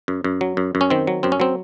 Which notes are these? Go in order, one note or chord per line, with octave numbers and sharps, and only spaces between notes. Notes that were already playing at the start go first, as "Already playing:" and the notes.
F#2
F#2
F#3
F#2
F#2
C#4
D#3 C4
F#3
F#2 C4
C#4
F#3 C4